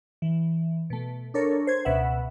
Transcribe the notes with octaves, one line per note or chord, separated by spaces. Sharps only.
E3
B2 A3
D4 A4 A#4 C#5
C5 G#6
C#2 B2 B4 E5 F#5